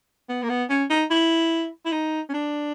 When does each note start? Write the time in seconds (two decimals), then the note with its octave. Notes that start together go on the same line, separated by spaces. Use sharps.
0.29 B3
0.43 A#3
0.49 B3
0.70 C#4
0.90 D#4
1.10 E4
1.85 E4
1.92 D#4
2.29 C#4
2.34 D4